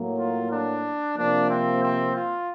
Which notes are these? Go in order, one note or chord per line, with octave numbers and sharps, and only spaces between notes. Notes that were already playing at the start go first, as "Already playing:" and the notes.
Already playing: A2 F#3 A#3
F4
D4
C3 F3 A#3 D4
C4
C4
F4